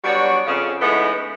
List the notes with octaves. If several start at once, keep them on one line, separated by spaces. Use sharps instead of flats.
F#3 G3 B3 D4 F#4 C#5
F2 C#3
C#3 E3 G#3 A3 B3 D#4